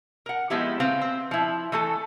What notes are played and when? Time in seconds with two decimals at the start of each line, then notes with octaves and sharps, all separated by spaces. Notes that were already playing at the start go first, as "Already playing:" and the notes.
0.26 A#4 F#5
0.50 F3 G#3 B3 E4 G4
0.80 C#3 C4 B4 F5
1.01 C4
1.31 F3 E4
1.72 E3 A3 A4